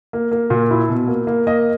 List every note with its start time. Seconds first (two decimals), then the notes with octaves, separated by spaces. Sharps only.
0.13 A#3
0.31 A#3
0.50 A#2
0.71 E4
0.89 B2
1.08 A#3
1.27 A#3
1.47 A#3 D#5